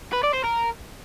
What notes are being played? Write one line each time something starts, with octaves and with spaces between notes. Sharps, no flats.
B4
D5
C5
A#4